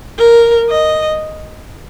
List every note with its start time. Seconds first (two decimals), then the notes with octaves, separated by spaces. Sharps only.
0.18 A#4
0.70 D#5